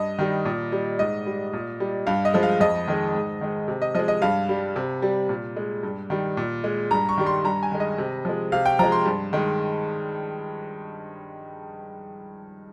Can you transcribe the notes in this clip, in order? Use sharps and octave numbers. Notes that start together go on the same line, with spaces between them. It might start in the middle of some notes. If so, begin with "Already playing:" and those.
Already playing: G2 D#5
D#3 G3
A#2
G3
G#2 D#5
G3
A#2
G3
G2 F5
D#5
F3 G#3
F5
F2 D#5
D#3 G#3
G#2
D#3 G#3
C3
D#5
F3 G#3 D#5
D#5
G2 F5
G3
C3
G3
A#2
G#3
G2
D#3 G3
A#2
G#3
G2 A#5
C#6
D#3 G3
C6
G2 A#5
G#5
D#3 G#3
D#5
C3
F3 G#3
C3 F5
G5
F3 G#3 A#5
C6
G2
D#3 G#3